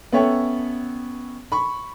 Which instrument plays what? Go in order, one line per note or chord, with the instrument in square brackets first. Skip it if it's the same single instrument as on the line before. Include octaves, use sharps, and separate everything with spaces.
[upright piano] B3 C#4 A4 C#5 E5 G5
B5 C#6